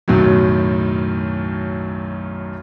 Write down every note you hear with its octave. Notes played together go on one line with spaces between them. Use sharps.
B1 F#2 A2 D#3 F#3